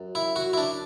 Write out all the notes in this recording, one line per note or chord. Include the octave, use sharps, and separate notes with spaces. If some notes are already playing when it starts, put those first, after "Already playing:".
Already playing: F#2
E4
F#4
E4
D4